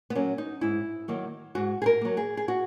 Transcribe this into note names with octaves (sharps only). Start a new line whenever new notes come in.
B3
F#3 A#3 C#4
D#4
G#2 E4
D#3 F#3 A#3
G#2 F#4
G#4
A#4
F#3 A#3
G#4
G#4
F#4